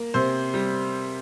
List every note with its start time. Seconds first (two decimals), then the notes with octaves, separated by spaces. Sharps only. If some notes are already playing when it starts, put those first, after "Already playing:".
Already playing: A#3
0.14 C3 C5
0.54 G3